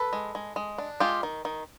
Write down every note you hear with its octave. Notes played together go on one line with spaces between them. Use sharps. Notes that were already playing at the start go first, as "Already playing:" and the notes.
Already playing: A4 B4
G#3
G#3
G#3
D4
G#3 F4 G4
D#3
D#3